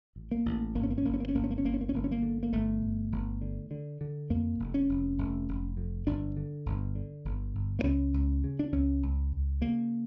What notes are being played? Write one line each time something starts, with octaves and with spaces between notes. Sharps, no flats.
A1
A#3
A1
G1 A#3
C#4
A#3
C#4
G1 A#3
C#4
A#3
C#4
G1 A#3
C#4
A#3
C#4
G1 A#3
C#4
A#3
C#4
G1 A#3
C#4
A#3
D3
A#3
G1 A3
G1
G1
D3
D3
D3
F2 A#3
F1
C#4
F1
F1
F1
F2
G1 D4
D3
G1
D3
G1
G1
A#3
C#2 C#4
C#2
C#3
D4
C#2 C#4
C#2
C#2
C#3 A#3